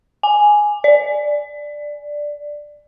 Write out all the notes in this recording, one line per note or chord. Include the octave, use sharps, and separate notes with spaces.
G#5
D5